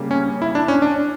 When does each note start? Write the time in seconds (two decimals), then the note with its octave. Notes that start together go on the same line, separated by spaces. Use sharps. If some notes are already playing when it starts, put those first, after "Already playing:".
Already playing: C#3 G3 A#3
0.11 C#4
0.42 E4
0.55 D4
0.68 C#4
0.82 D4